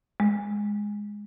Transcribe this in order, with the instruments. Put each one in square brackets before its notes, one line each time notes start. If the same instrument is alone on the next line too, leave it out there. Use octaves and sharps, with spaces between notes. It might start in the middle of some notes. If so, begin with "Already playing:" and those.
[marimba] G#3